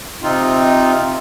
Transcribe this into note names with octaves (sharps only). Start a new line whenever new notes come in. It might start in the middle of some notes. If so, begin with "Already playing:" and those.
C3 C4 D#4 F4